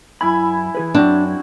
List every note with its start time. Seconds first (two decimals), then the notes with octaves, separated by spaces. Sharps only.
0.21 F#2 E4 G#5 B5
0.75 E3 G#4 B4
0.95 F#2 C4 D4 F#4